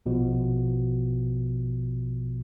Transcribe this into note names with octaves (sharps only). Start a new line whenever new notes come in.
A#1 B2 F3